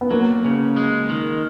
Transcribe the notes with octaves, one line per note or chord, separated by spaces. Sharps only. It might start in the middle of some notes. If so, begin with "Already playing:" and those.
B3
F#3 A#3
C#3
G#3
D#3